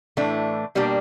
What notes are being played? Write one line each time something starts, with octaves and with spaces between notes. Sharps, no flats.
A2 E3 A3 D4
B2 G3 A#3 D4 G4